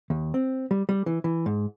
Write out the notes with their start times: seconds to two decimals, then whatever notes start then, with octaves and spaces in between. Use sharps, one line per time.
0.10 D#2
0.34 C4
0.71 G3
0.89 G3
1.06 E3
1.24 E3
1.46 G#2